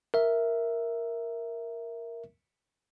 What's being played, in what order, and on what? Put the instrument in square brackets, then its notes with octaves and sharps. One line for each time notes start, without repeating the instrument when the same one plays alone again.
[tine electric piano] A#4 E5